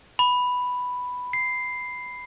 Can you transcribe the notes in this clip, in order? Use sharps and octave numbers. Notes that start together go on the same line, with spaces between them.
B5
C7